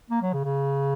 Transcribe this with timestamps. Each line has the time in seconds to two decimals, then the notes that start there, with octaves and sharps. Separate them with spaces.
0.10 A#3
0.22 F#3
0.33 C#3
0.44 C#3